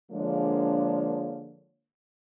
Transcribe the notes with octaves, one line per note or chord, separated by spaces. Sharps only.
D3 F3 G#3 A#3 D4 C#5